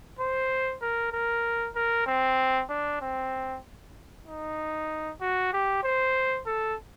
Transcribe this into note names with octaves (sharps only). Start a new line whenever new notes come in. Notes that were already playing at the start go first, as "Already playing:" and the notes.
C5
A#4
A#4
A#4
C4
D4
C4
D#4
F#4
G4
C5
A4